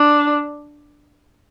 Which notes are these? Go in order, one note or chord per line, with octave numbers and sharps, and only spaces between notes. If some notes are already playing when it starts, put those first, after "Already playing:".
Already playing: D4